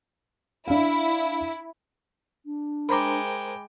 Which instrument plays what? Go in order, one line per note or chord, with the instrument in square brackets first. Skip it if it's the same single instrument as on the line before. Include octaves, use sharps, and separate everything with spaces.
[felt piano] D4 F5 [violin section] E4
[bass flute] D4
[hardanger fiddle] G#3 G5 [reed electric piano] A#4 C5 A#5 [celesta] B5 D6